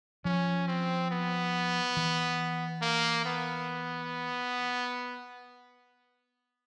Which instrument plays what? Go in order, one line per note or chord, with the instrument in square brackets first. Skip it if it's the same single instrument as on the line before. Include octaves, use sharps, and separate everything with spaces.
[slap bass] F3 [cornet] C#4
[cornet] C4
B3
[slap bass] E3
[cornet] A#3
B3